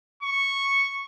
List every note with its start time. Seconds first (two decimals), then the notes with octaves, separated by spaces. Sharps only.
0.22 C#6